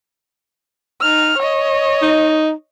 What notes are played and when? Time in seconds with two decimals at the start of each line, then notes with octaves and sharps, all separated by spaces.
1.01 D#4 F6
1.38 C#5 D#5
2.02 D#4